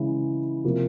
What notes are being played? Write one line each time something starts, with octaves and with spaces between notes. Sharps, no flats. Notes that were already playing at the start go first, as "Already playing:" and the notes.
Already playing: C#3 E3 G#3
C3 F3 A#3